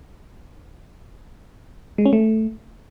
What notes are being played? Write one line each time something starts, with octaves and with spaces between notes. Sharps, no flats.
G#3
C#4
A3